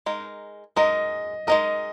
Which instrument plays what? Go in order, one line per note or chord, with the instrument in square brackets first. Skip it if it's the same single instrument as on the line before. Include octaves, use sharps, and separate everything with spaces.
[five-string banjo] G#3 D#4 A#4
[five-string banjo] G#3 D#4 A#4 [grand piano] D#5
[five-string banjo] G#3 D#4 A#4 [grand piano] D#5